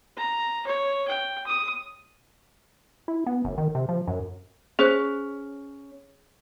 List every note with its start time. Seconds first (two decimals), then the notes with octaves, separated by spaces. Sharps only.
0.17 A#5
0.67 C#5
1.08 G5
1.46 D#6
3.08 E4
3.26 B3
3.45 F#1
3.58 D#3
3.75 C3
3.89 F3
4.07 F#2
4.79 C#4 G#4 C5 F#6